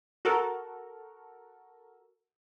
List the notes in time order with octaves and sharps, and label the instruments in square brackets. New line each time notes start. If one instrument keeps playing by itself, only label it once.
[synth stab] F#4 A4 A#4